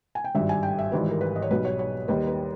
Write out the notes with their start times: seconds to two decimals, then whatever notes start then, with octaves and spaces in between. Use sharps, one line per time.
0.15 G#5
0.24 G5
0.35 G#1 G2 G3 E5
0.49 G#5
0.63 G5
0.79 E5
0.92 G#1 G#2 E3 G3 B4
1.11 A#4
1.21 B4
1.36 D#5
1.42 C#5
1.51 B1 B2 G3 B4
1.65 C#5
1.79 C#5
2.08 D#2 D#3 G3 B4
2.28 B4